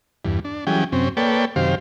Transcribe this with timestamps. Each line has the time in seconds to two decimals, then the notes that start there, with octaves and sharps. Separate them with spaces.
0.25 E2 G2
0.45 D4
0.67 E3 F#3 G3 C#4 G#4 G5
0.92 F#2 C3 C4 C#4
1.17 A#3 A4 B4 C#5 D5 G5
1.56 F#2 C3 D#3 G4 C5 F5